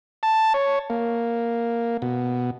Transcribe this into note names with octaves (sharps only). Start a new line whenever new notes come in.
A5
C#5
A#3
B2